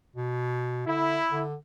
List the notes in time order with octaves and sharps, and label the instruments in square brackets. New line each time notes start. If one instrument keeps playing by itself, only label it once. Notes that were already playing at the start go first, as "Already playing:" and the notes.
[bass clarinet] B2
[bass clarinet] D3 [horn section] E4
[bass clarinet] D3